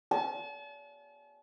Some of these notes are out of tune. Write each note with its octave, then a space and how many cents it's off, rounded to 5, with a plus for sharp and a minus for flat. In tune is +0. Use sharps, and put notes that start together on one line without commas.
A5 -40